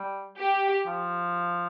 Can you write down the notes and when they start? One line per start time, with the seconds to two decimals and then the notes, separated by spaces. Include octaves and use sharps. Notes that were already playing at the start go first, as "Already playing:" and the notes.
Already playing: G3
0.39 G4
0.86 F3